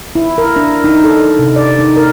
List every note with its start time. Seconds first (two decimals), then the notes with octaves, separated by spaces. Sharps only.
0.15 E4
0.38 A#4
0.56 D4
0.84 D#4
1.04 A4
1.39 C3
1.56 D5
1.79 D#4
1.97 A#4